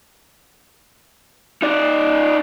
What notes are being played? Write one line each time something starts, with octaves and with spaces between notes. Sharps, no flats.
D#4 D5